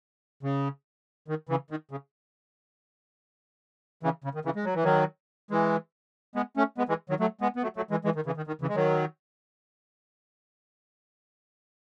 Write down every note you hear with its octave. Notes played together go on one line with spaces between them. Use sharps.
C#3
D#3
C#3 E3
D#3
C#3
C#3 E3
C#3
D#3
C#3 E3
G#3
F#3
E3
D#3 F#3
E3 G#3
G#3 B3
A3 C#4
G#3 B3
E3 G#3
D#3 F#3
F#3 A3
G#3 B3
B3
F#3 A3
F#3 A3
E3 G#3
E3 G#3
D#3
C#3 E3
D#3
D#3
C#3 E3
G#3
D#3 F#3